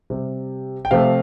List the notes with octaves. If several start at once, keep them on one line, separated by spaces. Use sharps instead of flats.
C3 G3
G5
C3 F3 A3 F5